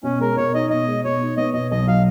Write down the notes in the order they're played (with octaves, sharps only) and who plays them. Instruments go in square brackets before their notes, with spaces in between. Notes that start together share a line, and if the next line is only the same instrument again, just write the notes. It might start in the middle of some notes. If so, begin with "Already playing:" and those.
[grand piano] B2 [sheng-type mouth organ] C#4
[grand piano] G#3 [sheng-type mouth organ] A#4
[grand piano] B2 [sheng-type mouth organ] C#5
[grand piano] D#4 [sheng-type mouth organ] D#5
[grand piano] B2 [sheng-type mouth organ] D#5
[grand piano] G#3
[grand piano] B2 [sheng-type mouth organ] C#5
[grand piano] D#4
[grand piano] B3 [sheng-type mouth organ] D#5
[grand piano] B2 [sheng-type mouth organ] D#5
[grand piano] B1 [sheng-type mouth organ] D#5
[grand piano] F#3 [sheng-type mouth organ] F5